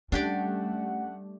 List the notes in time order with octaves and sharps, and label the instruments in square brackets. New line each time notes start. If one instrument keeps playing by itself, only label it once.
[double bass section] G3 A3 [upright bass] C#4 [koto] D4 G4 D5 [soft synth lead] F#5